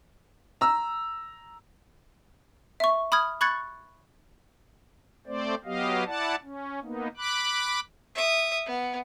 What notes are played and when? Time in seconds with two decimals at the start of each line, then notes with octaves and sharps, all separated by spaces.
0.61 A#5 E6
2.80 E5 C#6
3.12 B5 D#6 F6 G#6
3.41 B5 C#6 F#6 G#6 A6 C#7
5.27 A3 C4 C5 D5
5.65 F#3 B3 G4 D#5 F5
6.06 E4 D5 F#5 A5
6.42 C#4
6.83 A#3 B3 D#4
7.17 B5 D6 F#6
8.15 E5 D#6
8.66 B3